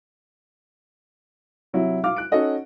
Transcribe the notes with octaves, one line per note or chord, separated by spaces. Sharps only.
C3 F#3 E4
F5 D6 F6
F#6 D7
C#4 D#4 F#4 A4 D#5 F#5